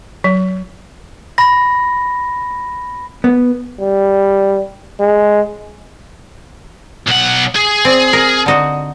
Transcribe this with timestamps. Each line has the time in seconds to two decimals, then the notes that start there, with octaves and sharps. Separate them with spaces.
0.24 F#3
1.38 B5 A#6
3.24 B3
3.80 G3
5.00 G#3
7.07 B1 F#5
7.56 G#4
7.85 C4 D5
8.13 A#4
8.46 D3 D#4 F#4